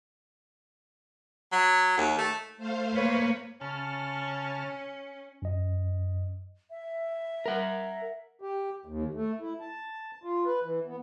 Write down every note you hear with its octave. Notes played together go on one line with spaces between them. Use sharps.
F#3
D#2
A3
A3 C5 F5
A#3 B4 C#5
C#3 C#4 A5 F6
F#2 D#5
E5
A#4 F#5
G4
D#2
A3
E4
A5
F4
B4
E3
B3